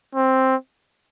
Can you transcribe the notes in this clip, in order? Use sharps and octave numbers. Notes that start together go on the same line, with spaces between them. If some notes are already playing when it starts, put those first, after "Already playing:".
C4